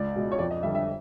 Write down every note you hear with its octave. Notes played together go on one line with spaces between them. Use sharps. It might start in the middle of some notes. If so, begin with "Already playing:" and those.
Already playing: C#2 D5
B2 G#3
C#5
F2 D5
D#5
D3 G3 E5
E5